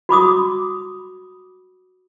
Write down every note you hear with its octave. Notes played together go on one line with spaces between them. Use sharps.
F#4 B5 D6 D#6